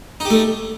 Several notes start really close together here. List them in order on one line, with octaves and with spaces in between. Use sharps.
D#4 G4 A3